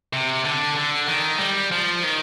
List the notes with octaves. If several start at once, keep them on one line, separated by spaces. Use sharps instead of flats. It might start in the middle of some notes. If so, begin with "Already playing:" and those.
C3
D3
D3
D#3
G3
F3
D#3